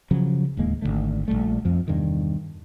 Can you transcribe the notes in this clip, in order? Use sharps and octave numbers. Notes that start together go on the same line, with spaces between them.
C#3 F3 F#3 C#4
D1 D#2 G#3 A#3
G#1 F2 D3 A3
A#1 E2 G3 A3
F2 F3
E2 G2 C3 D#3